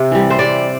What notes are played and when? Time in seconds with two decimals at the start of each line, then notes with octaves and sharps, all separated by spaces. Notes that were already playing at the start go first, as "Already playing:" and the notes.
Already playing: C3
0.11 E3 G3
0.30 C5
0.39 C3 D5